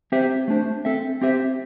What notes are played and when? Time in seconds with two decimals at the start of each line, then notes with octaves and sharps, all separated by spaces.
0.12 C4 G4 C5 E5
0.48 A3 D4 C5
0.85 C4 A4 E5
1.21 C4 G4 C5 E5